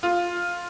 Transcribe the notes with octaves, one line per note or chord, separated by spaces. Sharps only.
F4